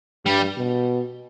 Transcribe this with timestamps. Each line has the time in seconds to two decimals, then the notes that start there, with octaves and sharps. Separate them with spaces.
0.26 G2 G3
0.57 B2